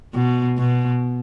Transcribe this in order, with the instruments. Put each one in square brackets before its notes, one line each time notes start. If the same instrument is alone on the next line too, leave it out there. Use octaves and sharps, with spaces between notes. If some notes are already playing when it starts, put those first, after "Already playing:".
[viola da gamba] B2
B2